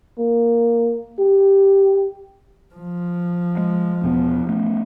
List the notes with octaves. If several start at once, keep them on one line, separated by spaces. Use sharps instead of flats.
A#3
G4
F3
G#3
E2 B2 B3
A3 B3 C#4